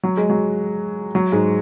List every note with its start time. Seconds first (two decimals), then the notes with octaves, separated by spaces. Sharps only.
0.03 F#3
0.17 G#3
0.30 F#3
1.15 F#3
1.32 G#2 G#3